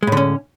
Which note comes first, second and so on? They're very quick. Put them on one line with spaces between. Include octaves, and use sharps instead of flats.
G#3 A2 D3 C#4